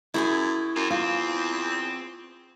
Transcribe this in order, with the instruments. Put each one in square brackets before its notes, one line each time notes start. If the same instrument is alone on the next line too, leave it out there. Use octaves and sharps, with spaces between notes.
[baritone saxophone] F#2 [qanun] E4 G#4 G#5
[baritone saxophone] F#2 [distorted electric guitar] C4 F4
[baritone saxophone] E2 [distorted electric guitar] C4 [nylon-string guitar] F4